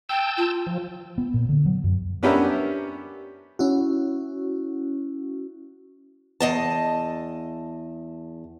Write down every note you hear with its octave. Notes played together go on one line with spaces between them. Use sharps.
G5 A5 E6 G6
F4
F3
B3
A#2
D3
F#3
F#2
B3 C#4 D4 G4 A#4 E5
C#4 E4 F#4
E2 D#5 A5